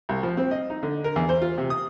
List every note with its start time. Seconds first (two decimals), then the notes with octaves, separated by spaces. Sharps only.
0.09 C2
0.23 F3
0.37 C4
0.51 D#5
0.70 D#4
0.83 D3
1.04 A#4
1.16 E2
1.29 C5
1.42 F4
1.58 C3
1.70 D#6